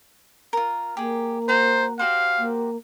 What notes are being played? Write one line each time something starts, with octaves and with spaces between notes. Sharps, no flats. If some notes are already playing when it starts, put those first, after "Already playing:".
F4 A#4
A#3 G4 G#4
F#4 C5 A#5
F#4 G4 C5 F5
A#3